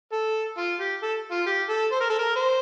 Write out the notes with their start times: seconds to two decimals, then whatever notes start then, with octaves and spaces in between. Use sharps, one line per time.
0.12 A4
0.57 F4
0.80 G4
1.02 A4
1.31 F4
1.46 G4
1.69 A4
1.92 C5
2.00 A#4
2.10 A4
2.19 A#4
2.36 C5